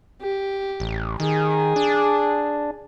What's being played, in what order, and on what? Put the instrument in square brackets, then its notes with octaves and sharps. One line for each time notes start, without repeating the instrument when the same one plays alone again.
[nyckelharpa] G4
[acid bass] A1
[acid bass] D#3 [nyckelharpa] G#4
[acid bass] D4